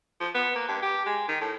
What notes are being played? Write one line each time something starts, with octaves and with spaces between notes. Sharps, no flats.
F3
B3
A#3
G2
G4
G#3
D#3
A2